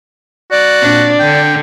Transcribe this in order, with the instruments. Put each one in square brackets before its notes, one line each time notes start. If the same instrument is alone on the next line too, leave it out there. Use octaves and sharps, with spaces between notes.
[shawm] F#4 [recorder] D5
[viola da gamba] A#2 C4 D4
[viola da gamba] D3 [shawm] G5